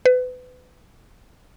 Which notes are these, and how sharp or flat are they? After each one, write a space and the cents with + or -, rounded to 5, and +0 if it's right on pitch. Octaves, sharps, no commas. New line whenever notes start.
B4 +30